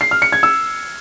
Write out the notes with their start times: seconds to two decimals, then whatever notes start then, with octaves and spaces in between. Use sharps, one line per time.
0.01 C7
0.11 F6
0.22 C#7
0.32 G#6
0.43 E6